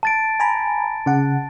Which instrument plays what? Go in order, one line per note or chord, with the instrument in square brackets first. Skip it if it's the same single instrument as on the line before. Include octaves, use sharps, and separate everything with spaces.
[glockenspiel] A5 A6 D7
[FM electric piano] G#5 A#5 B5
C#3 F#5